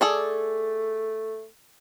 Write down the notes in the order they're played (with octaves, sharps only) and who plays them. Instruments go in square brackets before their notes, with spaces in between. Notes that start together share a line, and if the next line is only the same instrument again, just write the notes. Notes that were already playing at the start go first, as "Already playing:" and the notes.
[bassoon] A3 [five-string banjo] G#4 A4 D5